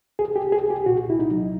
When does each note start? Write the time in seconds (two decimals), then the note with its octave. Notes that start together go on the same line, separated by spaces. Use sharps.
0.19 C2 G#4
0.36 G4
0.42 C2
0.52 G#4
0.64 C2
0.70 G4
0.86 A#2 F#4
1.08 C2 E4
1.19 D#4
1.31 F#3